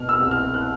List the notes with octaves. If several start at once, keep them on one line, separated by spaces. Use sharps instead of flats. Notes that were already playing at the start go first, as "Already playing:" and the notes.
Already playing: B2 F6
E6
C2
F6
F#6